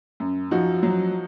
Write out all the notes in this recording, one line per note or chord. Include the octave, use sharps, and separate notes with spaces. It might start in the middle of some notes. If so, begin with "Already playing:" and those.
F#2
F3 D#4 F#4
F#3